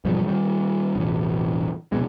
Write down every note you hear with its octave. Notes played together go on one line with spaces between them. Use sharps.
E1 G#2 F3 G3
D#3 G3
E1 A1
F1 B2 G#3